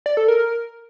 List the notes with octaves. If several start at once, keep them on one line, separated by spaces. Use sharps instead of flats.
D5
A4
A#4